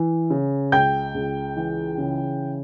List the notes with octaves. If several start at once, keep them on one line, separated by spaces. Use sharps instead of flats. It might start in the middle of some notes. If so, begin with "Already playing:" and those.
Already playing: E3
C#3
C#2 G5 G6
C#2
E3
C#3